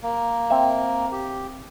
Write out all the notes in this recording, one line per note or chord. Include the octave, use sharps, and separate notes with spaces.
A#3
C4 E5
G4